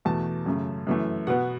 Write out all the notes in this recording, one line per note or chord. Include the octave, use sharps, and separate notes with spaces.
E2 B2 A3 A5
F#2 C#3 A3
F#2 E3 A3
B2 B3 F#5